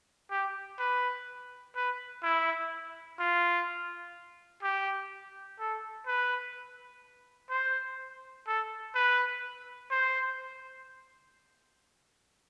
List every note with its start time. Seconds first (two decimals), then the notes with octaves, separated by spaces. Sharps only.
0.31 G4
0.79 B4
1.76 B4
2.23 E4
3.20 F4
4.63 G4
5.60 A4
6.07 B4
7.50 C5
8.47 A4
8.95 B4
9.91 C5